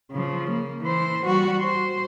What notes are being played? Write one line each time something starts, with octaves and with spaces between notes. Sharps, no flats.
C#3 F3
A#3
E3 C5
G3 F#4
C5